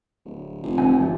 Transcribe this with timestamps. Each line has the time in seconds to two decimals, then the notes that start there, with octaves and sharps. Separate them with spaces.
0.25 D1
0.63 F1
0.78 C4 G#5
0.98 A1 G2 E3 F3